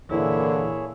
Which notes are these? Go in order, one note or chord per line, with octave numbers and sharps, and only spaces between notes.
A#2 D3 E3 A#3 E4 G#4 C#5